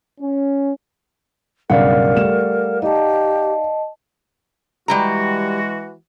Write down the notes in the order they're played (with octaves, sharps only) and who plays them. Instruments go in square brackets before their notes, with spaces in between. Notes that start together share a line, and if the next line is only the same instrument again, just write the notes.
[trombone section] C#4
[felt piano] B1 G2 C#3 [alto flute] A#4 [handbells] D5 F5 F#5
[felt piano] G3 A3 E7
[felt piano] D#4 [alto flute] G4 [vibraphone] D#5 A5
[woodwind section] E3 G#3 F#4 [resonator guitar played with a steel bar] G3 G4 A#5